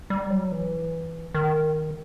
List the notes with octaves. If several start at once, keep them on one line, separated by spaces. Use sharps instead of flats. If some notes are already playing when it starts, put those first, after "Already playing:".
G3
F#3
E3
D#3